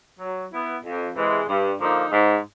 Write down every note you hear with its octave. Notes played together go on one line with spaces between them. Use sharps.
F#3
B3 E4
F2
C3 E3 G#3
G2
D3 F3 A#3 D#4
G#2